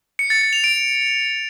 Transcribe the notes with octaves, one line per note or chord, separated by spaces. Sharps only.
C#7
A6
A6
F7
D7